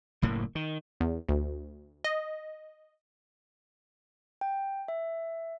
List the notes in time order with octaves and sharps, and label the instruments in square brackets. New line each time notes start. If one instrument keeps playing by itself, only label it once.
[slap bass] F#1 A2 A#3
D#3
[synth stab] E2
D2
D#5
[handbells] G5
E5